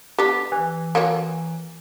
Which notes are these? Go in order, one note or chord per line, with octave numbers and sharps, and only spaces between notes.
B3 D4 G4
E3
A#3 F#4 C#5